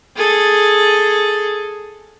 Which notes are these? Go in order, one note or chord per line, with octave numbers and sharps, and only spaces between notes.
G#4 A4